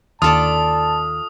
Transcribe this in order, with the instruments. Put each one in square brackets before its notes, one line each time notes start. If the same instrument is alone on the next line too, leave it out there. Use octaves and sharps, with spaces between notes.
[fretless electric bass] D#2 [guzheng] F4 A4 D5 [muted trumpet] A5 [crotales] D#6